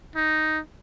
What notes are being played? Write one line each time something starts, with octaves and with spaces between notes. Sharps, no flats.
D#4